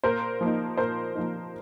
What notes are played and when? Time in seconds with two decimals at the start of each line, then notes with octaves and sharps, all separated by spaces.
0.04 A#2 A#4 C5
0.41 F3 A#3 D#4
0.77 A#2 A#4 C5
1.15 F3 A#3 D#4